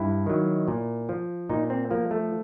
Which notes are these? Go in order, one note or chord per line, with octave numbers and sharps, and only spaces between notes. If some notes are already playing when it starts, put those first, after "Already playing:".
Already playing: G2 E4
D#3 F#3
A#2
F3
A#2 D#4
C4
F3 A#3
A3